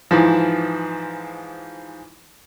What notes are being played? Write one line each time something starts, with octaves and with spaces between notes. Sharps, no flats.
G#2 E3 F3